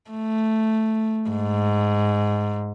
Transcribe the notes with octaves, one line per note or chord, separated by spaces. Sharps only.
A3
G#2